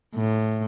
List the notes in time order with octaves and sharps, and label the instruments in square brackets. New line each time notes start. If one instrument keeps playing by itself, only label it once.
[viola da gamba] A2